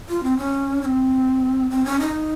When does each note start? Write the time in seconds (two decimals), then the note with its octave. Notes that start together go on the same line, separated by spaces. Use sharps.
0.09 F4
0.24 C4
0.37 C#4
0.82 C#4
0.85 C4
1.70 C4
1.85 C#4
2.00 D#4